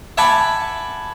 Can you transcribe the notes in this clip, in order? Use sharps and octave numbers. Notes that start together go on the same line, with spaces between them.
E5 F#5 G#5 A5 B5 D6